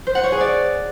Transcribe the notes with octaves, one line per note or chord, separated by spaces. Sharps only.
C5
F#5
C#5
G#4
D5